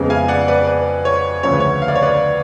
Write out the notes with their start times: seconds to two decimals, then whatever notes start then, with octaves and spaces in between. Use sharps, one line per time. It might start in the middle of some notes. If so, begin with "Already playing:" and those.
Already playing: F2 C#3 G#3 B3
0.10 F5 G#5
0.28 D5 F#5
0.48 B4 D5
0.67 B4
1.05 C#5
1.43 D2 C#3 F3 C#5
1.52 B4
1.60 C#5
1.82 F5
1.88 D5
1.96 C#5
2.02 B4 D5